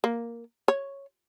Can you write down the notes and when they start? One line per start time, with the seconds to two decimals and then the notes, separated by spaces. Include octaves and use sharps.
0.04 A#3
0.68 C#5